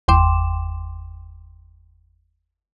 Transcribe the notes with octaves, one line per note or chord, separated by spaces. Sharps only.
G1 E2 G5 C6 D6 E7